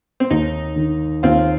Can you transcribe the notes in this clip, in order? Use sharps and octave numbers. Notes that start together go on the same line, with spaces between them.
C4
D#2 D#4
D#3
D#2 C4 F4